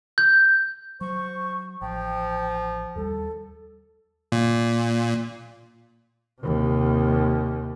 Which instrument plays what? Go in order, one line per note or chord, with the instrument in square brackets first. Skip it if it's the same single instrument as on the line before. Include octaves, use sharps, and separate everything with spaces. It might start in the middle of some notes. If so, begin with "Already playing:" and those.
[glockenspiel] G6
[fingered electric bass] F#3 [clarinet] C5 [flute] C#6
[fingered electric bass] A1 [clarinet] F3 [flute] G5
[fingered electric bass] D#2 G3 [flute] A4
[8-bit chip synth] A#2
[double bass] D#2 C3